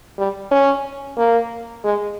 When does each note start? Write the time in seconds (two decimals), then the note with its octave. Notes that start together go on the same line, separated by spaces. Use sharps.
0.18 G3
0.51 C#4
1.18 A#3
1.84 G#3